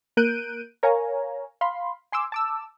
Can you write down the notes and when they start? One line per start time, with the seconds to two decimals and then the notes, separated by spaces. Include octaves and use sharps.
0.17 A#3 A#4 F#6 G6 D7 D#7
0.83 A#4 C#5 F5 G#5 A#5
1.61 F5 B5 C6
2.12 G#5 C6 D6 E6
2.32 A5 D6 E6